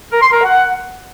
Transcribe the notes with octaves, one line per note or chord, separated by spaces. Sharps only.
A#4
C6
A#4
F#5